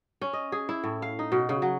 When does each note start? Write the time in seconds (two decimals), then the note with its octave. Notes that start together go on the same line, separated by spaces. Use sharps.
0.21 C#4
0.33 D#5
0.52 G#4
0.69 E4
0.84 A2
1.02 F5
1.19 D#4
1.32 B2
1.49 C#3
1.62 F#3